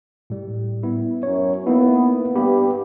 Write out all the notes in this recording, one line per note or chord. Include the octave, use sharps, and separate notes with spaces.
A2 G3
B3 E4
F#2 C#5
A#3 B3 D#4 E4
G2 B3 G4 B5